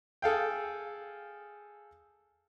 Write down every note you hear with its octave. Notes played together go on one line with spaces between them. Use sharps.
G#4 A4 F5 G5